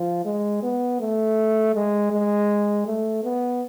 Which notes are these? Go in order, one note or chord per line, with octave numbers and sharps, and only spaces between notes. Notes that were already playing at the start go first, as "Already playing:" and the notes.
Already playing: F3
G#3
B3
A3
G#3
G#3
A3
B3